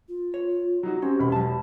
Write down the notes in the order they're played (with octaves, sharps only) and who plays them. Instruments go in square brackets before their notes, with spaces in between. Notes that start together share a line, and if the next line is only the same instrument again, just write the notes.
[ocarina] F4
[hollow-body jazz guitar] C#5
[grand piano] F#3 D#4 F#4
[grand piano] C4 [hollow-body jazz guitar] C#4 [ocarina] G4
[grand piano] E1 B5
[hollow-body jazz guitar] F#3 A5